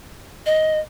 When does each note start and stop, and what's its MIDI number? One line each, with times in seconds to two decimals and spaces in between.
0.46 0.80 75